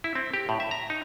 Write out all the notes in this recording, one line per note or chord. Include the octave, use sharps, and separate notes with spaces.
E4
C4
G4
A2
E5
A#5
D#4